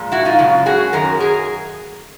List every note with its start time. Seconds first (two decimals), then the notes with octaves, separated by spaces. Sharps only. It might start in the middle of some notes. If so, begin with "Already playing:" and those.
Already playing: A#2 F3 G#3
0.12 E4 F#4
0.25 D#4 F4
0.39 F#2 C#3 G#3
0.66 F#4 G#4
0.93 F#2 D#3 F#3 A#4
1.20 G#4 A#4